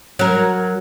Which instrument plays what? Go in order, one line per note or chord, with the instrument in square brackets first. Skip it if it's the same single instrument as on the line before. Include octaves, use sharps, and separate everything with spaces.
[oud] F#3 A#4